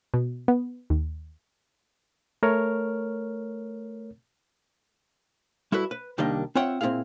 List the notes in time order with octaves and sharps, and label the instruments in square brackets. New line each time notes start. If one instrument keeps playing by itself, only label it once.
[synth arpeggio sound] B2
B3
D#2
[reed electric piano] A3 A#4 C#5 F6
[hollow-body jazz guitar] G3 E4 F#4 A4 B4
B4
C2 D#3 G3 A#3 D4 D#5
C4 F4 C#5 E5 F#5 G5
A#2 C4 D#4 E4 G#4 F5